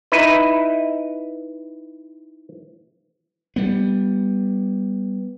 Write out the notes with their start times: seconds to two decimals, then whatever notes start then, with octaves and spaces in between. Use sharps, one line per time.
0.12 D#4 E4 B4
3.56 G3 B3